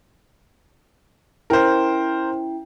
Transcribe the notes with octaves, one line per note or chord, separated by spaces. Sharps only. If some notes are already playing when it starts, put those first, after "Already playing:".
C#4 E4 A#4 C5 G5